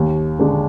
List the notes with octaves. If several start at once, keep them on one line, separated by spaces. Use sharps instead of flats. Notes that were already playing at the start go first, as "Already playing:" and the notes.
Already playing: D#2
D3 G#3 D4